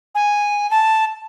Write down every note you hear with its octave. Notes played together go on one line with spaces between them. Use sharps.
G#5
A5